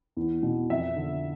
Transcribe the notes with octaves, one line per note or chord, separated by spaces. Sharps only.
E2
B2
F2 E5
D3